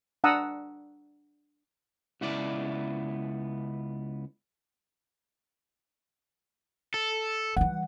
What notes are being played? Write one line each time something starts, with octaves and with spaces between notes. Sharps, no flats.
D4 F#5 A5 A#5 D#6 E6
C#2 B3 E4 D5
A4
E3 G3 F#5